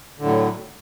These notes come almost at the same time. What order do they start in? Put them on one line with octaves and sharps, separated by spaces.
D3 A2 F#3